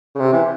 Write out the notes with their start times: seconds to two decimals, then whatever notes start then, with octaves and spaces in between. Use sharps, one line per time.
0.15 C#3
0.19 C3
0.33 E3